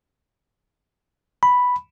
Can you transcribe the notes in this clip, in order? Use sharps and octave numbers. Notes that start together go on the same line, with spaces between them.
B5